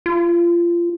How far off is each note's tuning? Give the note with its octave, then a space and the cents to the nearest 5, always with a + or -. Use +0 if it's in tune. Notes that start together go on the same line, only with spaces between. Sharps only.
F4 -25